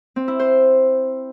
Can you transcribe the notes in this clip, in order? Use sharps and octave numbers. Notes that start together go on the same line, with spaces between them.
C4
E4
C5